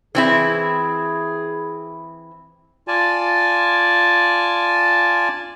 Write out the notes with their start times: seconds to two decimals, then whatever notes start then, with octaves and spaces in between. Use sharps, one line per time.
0.15 E3 C4 E4 G#4
2.88 F4 D5 G#5 A5